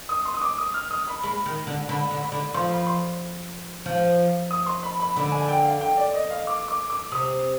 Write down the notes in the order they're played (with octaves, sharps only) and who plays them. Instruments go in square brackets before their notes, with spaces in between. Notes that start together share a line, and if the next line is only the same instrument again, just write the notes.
[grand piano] D#6
C6
D#6
D6
D#6
F6
D#6
B5
[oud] G#3 [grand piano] B5
[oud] D#3
D3
[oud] D3 [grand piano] B5
[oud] D3
[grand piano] B5
[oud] D3
[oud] F3 [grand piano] C6
[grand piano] B5
C6
[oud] F3
[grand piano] D#6
C6
B5
B5
[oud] D3 [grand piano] B5
[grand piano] G#5
G5
F5
G5
D5
D#5
F5
D6
D6
D6
[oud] C3 [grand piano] D#6